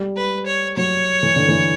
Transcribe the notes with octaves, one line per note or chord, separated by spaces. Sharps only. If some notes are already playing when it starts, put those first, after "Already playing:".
Already playing: G3
B4
C#5
F#3 C#5
E3
D3
E3